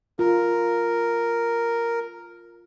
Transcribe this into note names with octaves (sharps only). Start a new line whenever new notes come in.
F4 A#4